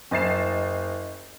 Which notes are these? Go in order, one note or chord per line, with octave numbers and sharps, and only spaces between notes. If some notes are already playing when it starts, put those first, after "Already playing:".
F#1 D#5 A6 C7 E7